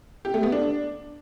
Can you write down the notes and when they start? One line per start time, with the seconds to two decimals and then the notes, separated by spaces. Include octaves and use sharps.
0.25 G4
0.34 A3
0.43 B3
0.52 D4